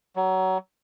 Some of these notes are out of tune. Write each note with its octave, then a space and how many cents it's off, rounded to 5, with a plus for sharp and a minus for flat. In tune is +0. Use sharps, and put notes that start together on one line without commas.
F#3 +25